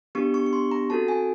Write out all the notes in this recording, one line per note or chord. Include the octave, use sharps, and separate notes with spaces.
B3 D4 G4 C#6
C#6
C#6
C6
A#5
C4 D#4 F#4 A4 A5
G#5